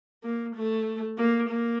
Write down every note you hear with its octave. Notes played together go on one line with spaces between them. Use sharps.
A#3
A3
A#3
A#3